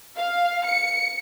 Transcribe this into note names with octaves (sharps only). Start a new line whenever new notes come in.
F5
C#7